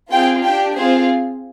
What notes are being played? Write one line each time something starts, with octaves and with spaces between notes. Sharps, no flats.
C4 F4 G#4 G5
D4 G4 G5
C4 F4 G#4 C5